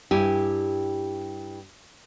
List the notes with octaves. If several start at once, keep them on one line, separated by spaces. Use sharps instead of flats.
G2 E4 G4 G#5